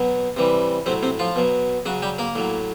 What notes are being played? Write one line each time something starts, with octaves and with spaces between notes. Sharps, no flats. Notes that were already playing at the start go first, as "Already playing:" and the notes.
Already playing: B2 F#3
C3 E3 G3
A2 C3 F#3 C4
C3 C4
F3 F4
B2 F#3
C#3 F#3 F#4
G3 G4
A#3 A#4
A2 F#3